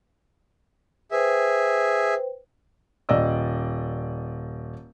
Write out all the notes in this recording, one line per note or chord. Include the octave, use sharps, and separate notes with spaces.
G#4 B4 C5 E5 G5
D#1 D5 D#5 E6